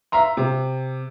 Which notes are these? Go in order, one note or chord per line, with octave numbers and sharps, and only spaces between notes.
E5 F5 A#5 C6
C3